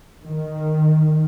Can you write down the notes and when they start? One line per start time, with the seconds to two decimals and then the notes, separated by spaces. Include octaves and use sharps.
0.25 D#3